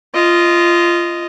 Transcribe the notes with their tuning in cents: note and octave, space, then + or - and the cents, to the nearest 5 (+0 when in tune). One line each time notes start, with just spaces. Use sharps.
F4 -15 D#5 +0